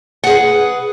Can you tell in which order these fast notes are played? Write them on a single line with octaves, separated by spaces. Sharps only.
F#5 G#4 B4